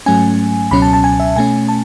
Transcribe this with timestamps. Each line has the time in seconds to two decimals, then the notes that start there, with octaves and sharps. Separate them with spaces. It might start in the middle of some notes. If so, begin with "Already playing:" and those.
0.06 G#2 F#3 A3 C#4 G#5
0.71 C#2 B2 F#3 C#4 B5
0.82 A5
0.93 A5
1.04 G#5
1.20 E5
1.36 B2 A3 C#4 G#5
1.69 A5